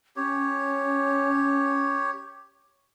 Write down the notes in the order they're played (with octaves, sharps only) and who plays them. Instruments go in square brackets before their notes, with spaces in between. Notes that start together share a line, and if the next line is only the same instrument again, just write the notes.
[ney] C#4 [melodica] G4 C#5